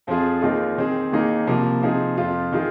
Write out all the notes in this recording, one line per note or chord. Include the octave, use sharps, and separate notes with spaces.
F2 F3 C4 F4 G#4
D#2 D#3 G#3 F4 G#4
D#3 C4 G#4
D#2 D#3 A#3 D#4 G#4
C2 C3 F3 A#3
C3 F3 C4 D#4 G#4
F2 F3 C4 F4
D#3 G#3 F4 G#4